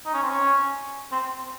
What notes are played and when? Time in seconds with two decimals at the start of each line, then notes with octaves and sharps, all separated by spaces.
0.06 D#4
0.14 C#4
0.22 C4
0.30 C#4
1.12 C4